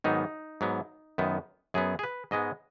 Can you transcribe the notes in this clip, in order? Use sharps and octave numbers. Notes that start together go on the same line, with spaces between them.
G#2 D#3 F#3 B3 D#4
G#2 F#3 B3
F#2 D#3 B3
F#2 F#3 B3 G#4
G#4
B4
G#2 G#3 B3 D#5